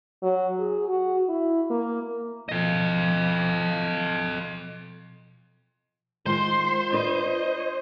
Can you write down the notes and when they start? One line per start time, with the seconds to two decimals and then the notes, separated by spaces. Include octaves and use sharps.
0.23 F#3
0.59 G#4
0.88 F#4
1.29 E4
1.70 A#3
2.49 B2 F3 A4 D#5
6.26 D#3 G#3 F4 C5 C6
6.92 D4 B4 D#5